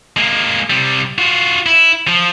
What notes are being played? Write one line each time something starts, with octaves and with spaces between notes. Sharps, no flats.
G#3 A#3
C3 G3
F4 F#4
E4
F3